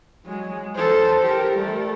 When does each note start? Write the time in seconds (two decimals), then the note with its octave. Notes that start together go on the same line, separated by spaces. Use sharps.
0.25 F#3 G#3
0.76 A4 C5
1.23 G4 A#4
1.55 G3 A3